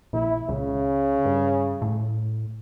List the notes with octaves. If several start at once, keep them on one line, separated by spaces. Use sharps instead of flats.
A#1 E4
C#2 C#3
G2
A2